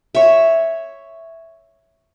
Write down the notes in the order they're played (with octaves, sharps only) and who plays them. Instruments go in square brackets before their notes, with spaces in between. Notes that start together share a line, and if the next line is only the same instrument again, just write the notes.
[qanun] C#5 E5